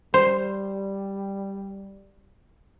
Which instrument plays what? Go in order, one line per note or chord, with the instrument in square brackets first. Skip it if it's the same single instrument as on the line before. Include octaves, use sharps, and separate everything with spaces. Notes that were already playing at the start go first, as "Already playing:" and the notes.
[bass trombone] G3 [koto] C5